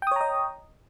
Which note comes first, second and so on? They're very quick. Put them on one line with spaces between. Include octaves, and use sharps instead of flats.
G5 D#6 C#5 A#5 D#5